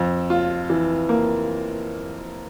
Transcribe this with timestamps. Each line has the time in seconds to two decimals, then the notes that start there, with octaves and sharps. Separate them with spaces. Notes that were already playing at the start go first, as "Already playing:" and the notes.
Already playing: F2
0.30 F4
0.70 E3
1.09 A#3